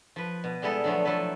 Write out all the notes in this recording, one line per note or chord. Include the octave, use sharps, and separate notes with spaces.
F3 B4
B2
G3 G#3 B3 E4 A4
D3 F3 F#3 A3 B3
F3 F#3 E4 A4 B4